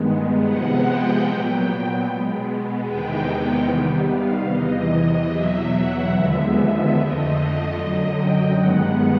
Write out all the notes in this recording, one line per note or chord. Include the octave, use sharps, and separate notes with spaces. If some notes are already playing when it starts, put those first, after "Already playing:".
Already playing: G2 D#3 G#3 B3
C3 F3 G#3 B3 F#5
G5
A#2 F#3 B3
B2 G#3 B3
E2 C3 D#3 G#3 B3 G5
C3 D#3 G3 B3
F5
E2 C3 E3 D#5
E2 B2 F#3 E5
F#5
D#2 D3 F3 G#3 B3 E5
F2 D3 F3 A3 D#5
F#2 D3 F#3 D#5
G5
G2 D#3 G#3 B3 F#5